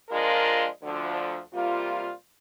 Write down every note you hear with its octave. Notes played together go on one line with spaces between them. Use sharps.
F3 G#3 D4 F4 A#4
D2 D3 F3
C3 G3 A#3 F4